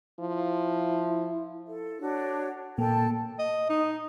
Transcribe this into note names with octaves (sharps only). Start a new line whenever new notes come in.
F3 E4
A4
D4 F#4 C#5
A#2 A#3 A4 G5 A5
D#5
D#4